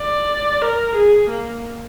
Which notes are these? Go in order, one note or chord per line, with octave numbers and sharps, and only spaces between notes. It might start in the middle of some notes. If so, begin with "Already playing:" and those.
Already playing: D5
A#4
G#4
A#3